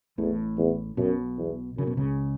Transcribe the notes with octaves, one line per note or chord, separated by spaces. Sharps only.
A1 E2 A2
E2
B1 F#2 B2
E2
F#2 C#3
B2
C#2 C#3